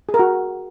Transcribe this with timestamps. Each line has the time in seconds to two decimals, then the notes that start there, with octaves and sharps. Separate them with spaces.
0.09 G#4
0.14 A#4
0.19 F#4